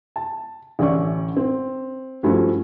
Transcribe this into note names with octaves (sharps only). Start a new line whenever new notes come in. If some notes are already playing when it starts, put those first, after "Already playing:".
A5
A1 D3 C#4 D5 E5 C#6
C4
G2 F3 A3 C#4 E4 F#4